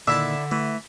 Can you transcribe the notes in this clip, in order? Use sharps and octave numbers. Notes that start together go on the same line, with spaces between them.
A#2 D3 D#3 D4 E4 E5 A5
E3 A3